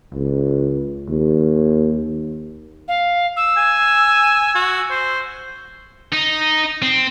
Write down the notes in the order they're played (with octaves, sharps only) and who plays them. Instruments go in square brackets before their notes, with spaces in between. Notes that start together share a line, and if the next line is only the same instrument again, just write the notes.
[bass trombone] C#2
D#2
[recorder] F5
E6
[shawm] G#5
F#4
C5
[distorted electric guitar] D#4
C4